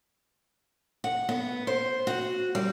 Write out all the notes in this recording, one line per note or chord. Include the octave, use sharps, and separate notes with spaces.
F#5
B3
C5
F#4
G3